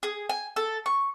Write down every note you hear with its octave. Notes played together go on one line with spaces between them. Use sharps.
G#4
G#5
A4
C#6